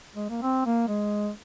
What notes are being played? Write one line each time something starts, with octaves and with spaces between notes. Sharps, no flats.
G#3
A#3
C4
A#3
G#3